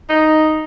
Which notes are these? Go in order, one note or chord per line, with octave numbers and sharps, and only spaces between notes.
D#4